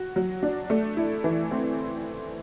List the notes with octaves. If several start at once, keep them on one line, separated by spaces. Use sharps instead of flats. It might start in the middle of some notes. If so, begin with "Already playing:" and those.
Already playing: F#4
F#3
D4
A3
E4
E3
C4